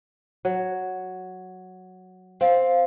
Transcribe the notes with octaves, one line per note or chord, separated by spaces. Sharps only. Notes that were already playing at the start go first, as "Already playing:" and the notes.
F#3
C4 F5